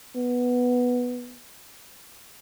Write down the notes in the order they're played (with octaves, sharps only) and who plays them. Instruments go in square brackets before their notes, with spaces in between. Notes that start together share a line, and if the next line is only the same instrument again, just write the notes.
[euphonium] B3